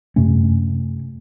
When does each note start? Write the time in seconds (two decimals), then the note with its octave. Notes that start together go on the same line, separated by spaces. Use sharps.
0.16 F#2 C3 A3 C#4